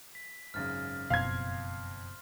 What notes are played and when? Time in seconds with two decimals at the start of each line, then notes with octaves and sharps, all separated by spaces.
0.15 B6
0.54 G#1 F#2 C#3 F6 A6 A#6
1.10 F#1 F2 B2 F5 C6 G#6